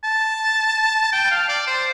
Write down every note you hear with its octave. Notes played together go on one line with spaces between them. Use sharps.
A5
G5
F5
D5
C5